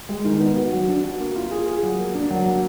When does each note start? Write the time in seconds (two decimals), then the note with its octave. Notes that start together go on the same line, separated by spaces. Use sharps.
0.09 G#3
0.25 D#3
0.40 B3
0.56 F#4
0.72 F#3
0.88 D4
1.04 F#4
1.19 A#3
1.36 F4
1.51 G#4
1.67 G#4
1.83 F#3
1.99 A#3
2.14 D4
2.30 F#3
2.46 A#3